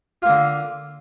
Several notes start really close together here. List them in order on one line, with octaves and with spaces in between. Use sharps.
F4 A#3 D3